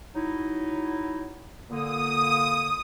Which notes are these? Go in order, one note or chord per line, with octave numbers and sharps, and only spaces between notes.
F#3 D#4 E4
A#2 D3 A#3 D#6